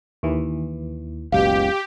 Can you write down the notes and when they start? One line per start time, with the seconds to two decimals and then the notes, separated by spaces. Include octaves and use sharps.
0.23 D#2 E3
1.32 F#1 C#2 B2 G4 F5